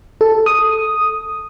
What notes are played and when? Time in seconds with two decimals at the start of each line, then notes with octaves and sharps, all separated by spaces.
0.21 A4
0.46 D#6